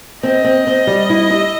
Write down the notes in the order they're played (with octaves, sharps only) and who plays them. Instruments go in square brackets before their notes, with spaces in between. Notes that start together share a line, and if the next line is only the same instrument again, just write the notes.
[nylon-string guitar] C4 [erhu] D#5
[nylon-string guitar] C4
C4
G3
E4
E4